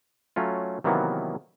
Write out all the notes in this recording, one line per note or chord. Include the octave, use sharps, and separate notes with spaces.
F#3 A3 C#4 F4
C3 D#3 E3 F#3 A#3 B3